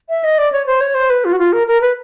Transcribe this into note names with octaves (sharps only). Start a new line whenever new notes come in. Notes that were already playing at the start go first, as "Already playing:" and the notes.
E5
D#5
D5
C#5
C5
C#5
C5
B4
F4
F#4
F4
A#4
A#4
B4